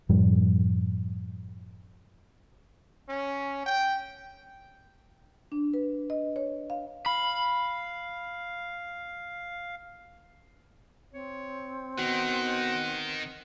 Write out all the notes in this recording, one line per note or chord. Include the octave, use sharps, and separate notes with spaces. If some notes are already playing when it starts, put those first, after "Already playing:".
F#2 A2 F3 G3
C#4
G5
D4
B4
D#5
C#5
F5
F5 B5
C4 C#5
B2 D#3 F#5